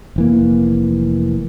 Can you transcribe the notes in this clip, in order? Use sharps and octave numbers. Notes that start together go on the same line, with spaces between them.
F1 E3 A#3